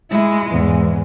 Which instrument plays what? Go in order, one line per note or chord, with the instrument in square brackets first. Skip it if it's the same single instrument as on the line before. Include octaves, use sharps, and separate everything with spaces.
[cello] G#3 [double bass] E4
[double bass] E2 G#2